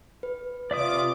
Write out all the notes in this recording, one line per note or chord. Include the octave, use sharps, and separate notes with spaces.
B4
C3 F4 D5 E5 D6 D#6